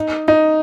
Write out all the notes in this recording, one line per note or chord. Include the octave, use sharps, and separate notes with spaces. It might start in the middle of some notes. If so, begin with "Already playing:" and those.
Already playing: D#4
D#4